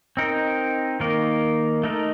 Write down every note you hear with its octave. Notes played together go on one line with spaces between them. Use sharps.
C4 D#4 A#4
D#3 A#3 D#4 A#4
A3 D#4 A#4